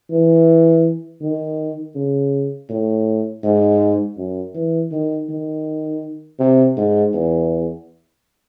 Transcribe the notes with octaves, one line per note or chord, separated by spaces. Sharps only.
E3
D#3
C#3
A2
G#2
F#2
E3
D#3
D#3
C3
G#2
E2